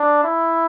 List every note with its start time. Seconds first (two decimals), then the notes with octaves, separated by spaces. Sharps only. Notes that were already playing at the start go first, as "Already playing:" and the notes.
Already playing: D4
0.24 E4